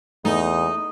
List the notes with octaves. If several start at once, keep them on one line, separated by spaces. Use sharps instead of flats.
E2 A3 D#4